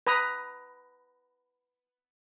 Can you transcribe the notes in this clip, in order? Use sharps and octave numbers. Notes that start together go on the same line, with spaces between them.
B4 A#5 D#6